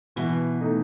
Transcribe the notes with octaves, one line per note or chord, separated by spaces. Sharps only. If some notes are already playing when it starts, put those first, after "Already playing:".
B2 E3
A3 D#4